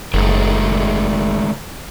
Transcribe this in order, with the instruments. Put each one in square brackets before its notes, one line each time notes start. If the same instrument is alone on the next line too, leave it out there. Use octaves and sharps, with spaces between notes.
[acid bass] F#1 [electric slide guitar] D#3 G#3 A3